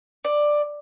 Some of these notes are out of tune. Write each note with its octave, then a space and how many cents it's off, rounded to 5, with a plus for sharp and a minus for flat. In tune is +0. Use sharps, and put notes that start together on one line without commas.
D5 +10